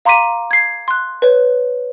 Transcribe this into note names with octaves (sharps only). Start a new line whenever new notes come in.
F5 A#5 C6 D6 B6 D#7
G#6 C7
C6 F#6
B4 C#5